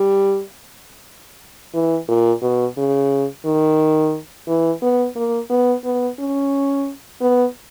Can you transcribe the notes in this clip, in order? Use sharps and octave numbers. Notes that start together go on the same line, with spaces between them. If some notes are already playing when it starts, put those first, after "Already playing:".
Already playing: G3
E3
A#2
B2
C#3
D#3
E3
B3
A#3
B3
B3
C#4
B3